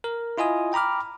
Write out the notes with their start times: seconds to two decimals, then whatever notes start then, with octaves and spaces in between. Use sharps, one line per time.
0.04 A#4
0.38 E4 F4 D#5 G#5 D#6
0.73 G5 A#5 B5 D6 F6